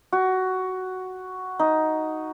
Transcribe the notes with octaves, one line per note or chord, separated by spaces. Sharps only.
F#4
D#4